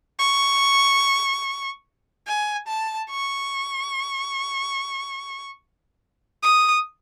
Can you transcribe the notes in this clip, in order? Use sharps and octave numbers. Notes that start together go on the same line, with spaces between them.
C#6
G#5
A5
C#6
D#6